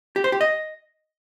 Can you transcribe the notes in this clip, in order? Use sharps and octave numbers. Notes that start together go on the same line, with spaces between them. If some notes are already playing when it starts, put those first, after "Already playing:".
G4
C5
G4
D#5